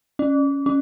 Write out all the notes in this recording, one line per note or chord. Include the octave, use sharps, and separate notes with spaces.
C#4
C#4